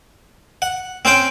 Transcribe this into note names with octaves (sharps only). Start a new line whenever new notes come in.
F#5
C4 C#4 C5 G5